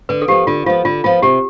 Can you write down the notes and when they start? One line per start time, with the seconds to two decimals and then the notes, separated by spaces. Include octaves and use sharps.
0.09 D3 B4
0.22 A4
0.28 F3 B3 G4
0.47 D3 F4
0.66 F3 B3 F4
0.85 D3 F4
1.04 F3 B3 F4
1.22 C3 G4